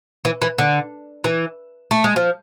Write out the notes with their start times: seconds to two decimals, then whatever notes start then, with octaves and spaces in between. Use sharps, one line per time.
0.25 E3
0.42 E3
0.58 D3
1.24 E3
1.91 A3
2.04 G#3
2.16 F3